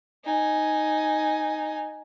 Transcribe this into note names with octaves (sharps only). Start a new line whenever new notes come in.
D#4 G#5